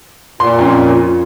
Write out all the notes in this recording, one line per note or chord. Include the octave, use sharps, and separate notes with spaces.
A#2 C6
F2 C#4